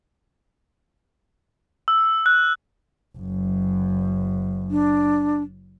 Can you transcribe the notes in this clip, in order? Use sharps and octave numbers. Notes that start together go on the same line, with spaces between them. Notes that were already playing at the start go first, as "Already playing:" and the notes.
E6
F#6
F#1 F#2
D4